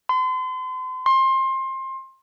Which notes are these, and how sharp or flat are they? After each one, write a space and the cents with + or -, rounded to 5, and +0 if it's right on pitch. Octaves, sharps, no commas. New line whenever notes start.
C6 -40
C6 +25